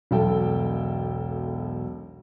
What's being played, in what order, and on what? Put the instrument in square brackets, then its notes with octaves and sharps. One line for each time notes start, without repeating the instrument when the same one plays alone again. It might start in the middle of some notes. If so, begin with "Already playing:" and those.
[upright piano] E1 B1 A4 G5